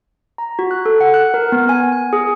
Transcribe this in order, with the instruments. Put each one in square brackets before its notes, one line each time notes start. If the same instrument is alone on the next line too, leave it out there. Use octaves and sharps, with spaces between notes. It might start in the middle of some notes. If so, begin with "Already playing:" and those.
[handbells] A#5
F#4
F#6
A4
F#5
F#6
A#4
B3
G#5
G#5
G#4